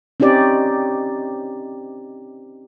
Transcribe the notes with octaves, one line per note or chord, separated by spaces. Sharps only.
C4 C#4 D#4 G4 D5